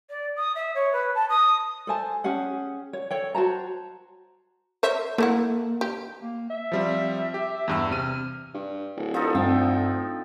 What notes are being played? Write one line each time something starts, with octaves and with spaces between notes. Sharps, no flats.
D5
D#6
E5
C#5
B4
A5
D#6
A4 C5 G#5 A5
C#4 G4 G#4 F#5
C#5
A4 C#5 G5
F#4 C5 A5 A#5
C5 C#5 E5
A3 A#3 E4 F#5
G4
A#3
E5
F3 G3 C4
G4
E2 G2 E6
C3 F6 D#7
G2
D1
F3 D#4 A4
D2 G2 C4 G5